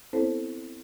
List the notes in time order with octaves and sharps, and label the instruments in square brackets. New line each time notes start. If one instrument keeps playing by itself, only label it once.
[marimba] B3 C4 E4 A4 C5 C#5